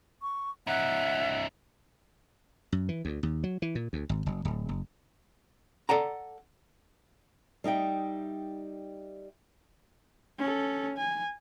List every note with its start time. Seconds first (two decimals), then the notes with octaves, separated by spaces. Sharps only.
0.22 C#6
0.67 C#4 D#4 E5 F#5
2.72 F#2
2.89 E3
3.05 D2
3.23 D#2
3.44 F#3
3.62 E3
3.75 A#2
3.93 D2
4.09 G#1
4.26 F#1
4.45 D1
4.69 F#1
5.89 A4 D5 F#5 A#5
7.64 G3 D#4 E5 G5
10.39 C#4 A4
10.98 G#5